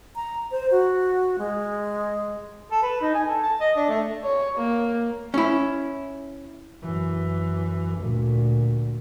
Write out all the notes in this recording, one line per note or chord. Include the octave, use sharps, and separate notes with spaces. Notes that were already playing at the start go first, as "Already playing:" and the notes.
A#5
C5
F#4
G#3
A4
B4
D#4
G#5
A4
A5
D#5
D4
A3
C#5
A#3
C#4 E4
F#2 E3
D2 A#2